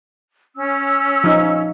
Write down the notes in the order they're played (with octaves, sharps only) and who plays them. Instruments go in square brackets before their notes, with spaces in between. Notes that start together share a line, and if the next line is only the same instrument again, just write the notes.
[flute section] C#4 E6
[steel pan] F3 D#4